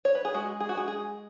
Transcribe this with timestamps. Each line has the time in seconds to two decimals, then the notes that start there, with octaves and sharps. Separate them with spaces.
0.05 C#5
0.15 B4
0.25 G#4
0.34 G#3 F#4
0.60 G#4
0.69 F#4
0.75 G#3 G#4
0.88 G#4